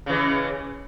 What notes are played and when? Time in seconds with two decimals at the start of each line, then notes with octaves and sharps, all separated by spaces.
0.06 C#3
0.09 E3
0.12 G#3